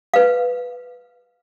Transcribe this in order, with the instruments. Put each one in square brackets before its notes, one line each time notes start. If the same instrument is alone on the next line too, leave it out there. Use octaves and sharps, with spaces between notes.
[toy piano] B4 F5